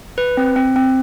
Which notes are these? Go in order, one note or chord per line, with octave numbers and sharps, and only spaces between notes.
B4
C4
C4
C4